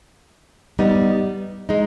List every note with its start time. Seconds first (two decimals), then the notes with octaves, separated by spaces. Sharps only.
0.79 G3 B3 D#4
1.69 G#3 D#4